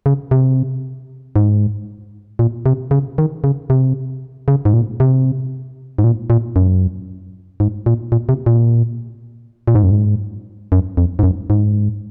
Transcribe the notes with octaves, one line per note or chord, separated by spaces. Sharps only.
C#3
C3
G#2
A#2
C3
C#3
D#3
C#3
C3
C#3
G#2
A#2
C3
G#2
A#2
A#2
F#2
G#2
A#2
A#2
C3
A#2
A#2
G#2
F#2
G#2
F#2
F2
G#2
F#2
G#2